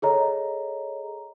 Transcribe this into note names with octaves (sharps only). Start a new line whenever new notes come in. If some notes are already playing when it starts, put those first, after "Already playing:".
G#4 A4 C#5 D#5 A#5